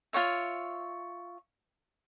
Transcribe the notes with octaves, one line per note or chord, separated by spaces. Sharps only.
F4 F#4 C#5 E5